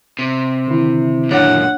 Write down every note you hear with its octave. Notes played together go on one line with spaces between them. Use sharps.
C3
D3 D#3 E4
F#2 A#2 D4 A4 C#5 F#5